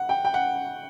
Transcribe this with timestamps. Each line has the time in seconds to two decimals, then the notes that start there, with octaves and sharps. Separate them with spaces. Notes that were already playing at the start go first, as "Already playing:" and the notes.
Already playing: F#5
0.09 G5
0.25 G5
0.34 F#5